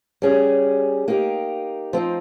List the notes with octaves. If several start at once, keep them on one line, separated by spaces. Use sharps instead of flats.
G3 C#4 G#4
A#3 D#4 G4
F3 C4 D#4